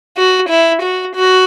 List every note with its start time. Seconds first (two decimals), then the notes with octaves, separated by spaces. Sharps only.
0.17 F#4
0.49 E4
0.82 F#4
1.15 F#4